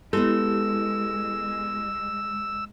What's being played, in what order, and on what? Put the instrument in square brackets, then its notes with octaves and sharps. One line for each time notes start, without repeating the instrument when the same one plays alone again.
[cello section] G#3 [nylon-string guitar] B3 A4 [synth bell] E4 G4 [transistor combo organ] E6